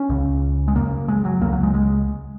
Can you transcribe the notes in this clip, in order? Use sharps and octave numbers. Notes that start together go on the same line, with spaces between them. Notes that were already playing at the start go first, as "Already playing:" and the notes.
Already playing: C#4
C#2 C#3
G#3
F#2 C#3 A#3
G#3
F#3
C#2 C#3 A#3
F#3
G#3
G#3